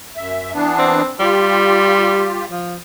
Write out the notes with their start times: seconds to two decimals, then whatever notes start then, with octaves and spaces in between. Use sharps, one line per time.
0.16 F#2 E5
0.53 E3 B3 D4
0.78 C4
1.20 G3 F4 G4
2.51 F3